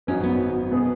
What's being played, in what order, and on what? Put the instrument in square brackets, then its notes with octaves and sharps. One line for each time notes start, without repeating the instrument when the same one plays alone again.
[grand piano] G#1 F#2 F#3 D#4 B4 [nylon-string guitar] C#4
[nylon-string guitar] B3
[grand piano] B2 B3 G#4 B4